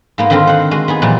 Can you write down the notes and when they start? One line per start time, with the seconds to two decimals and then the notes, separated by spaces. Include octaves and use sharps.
0.18 G#2 A#3 B3
0.30 D3 D#3 C4 F4 A4 A#4
0.47 C5 F#5
0.71 G#3 F#4
0.88 B3 D#4 G#4
1.02 A#2 E3 F#3 G3